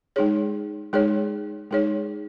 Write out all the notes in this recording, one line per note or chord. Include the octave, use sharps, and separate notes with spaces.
G#3 D#4 G#4 C#5
G#3 D#4 G#4 C#5
G#3 D#4 G#4 C#5